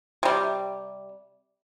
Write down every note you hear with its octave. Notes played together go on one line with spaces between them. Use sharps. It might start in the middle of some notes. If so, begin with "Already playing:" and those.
C3 G3